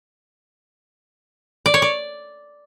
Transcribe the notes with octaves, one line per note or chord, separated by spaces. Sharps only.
D5
C#5
D5